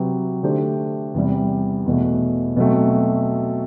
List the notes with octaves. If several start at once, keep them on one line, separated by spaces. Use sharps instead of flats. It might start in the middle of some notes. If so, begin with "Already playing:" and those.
Already playing: C3 F#3 C4 G4 B4
D3 A3 D4 G4 C5
E2 C3 G3
E2 B2 A3
B2 F#3 A3 C4